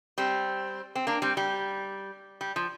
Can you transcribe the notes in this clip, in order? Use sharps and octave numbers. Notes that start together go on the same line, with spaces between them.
G3 C4
C4
A#3 D4
G3 C4
G3
G3
F3